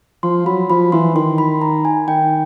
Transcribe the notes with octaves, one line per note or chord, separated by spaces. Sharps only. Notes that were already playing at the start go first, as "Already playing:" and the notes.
F3 C6
F#3 B5
F3 B5
E3 C6
D#3 C6
B5
A#5
G#5
D#3 G5